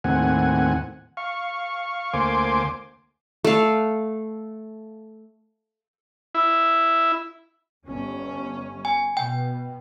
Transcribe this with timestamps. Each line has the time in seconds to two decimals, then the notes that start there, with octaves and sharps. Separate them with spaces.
0.04 D#2 A2 C4 F#5 G#5
1.17 F5 C#6
2.14 D2 A#3 C5 G#5 C6 D6
3.44 A3 F5
6.35 E4
7.87 G1 C#4
8.85 G#5
9.17 B2 G5